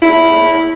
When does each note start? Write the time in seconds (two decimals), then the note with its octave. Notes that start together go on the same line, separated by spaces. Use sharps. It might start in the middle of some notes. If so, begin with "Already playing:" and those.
0.02 E4